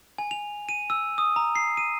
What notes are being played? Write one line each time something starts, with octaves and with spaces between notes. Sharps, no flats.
G#5
F7
D#7
E6
D#6
A#5
C7
D#7